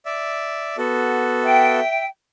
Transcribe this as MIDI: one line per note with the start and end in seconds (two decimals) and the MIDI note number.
0.06 0.76 74
0.06 0.76 76
0.78 1.80 59
0.78 1.80 66
0.78 1.80 69
1.43 2.06 76
1.43 2.06 79